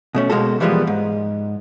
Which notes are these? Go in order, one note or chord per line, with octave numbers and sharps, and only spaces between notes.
B2 A3 C#4
B2 G#3 A#3 F#4 A4
E3 F3 G3 G#3 A#3 B3
G#2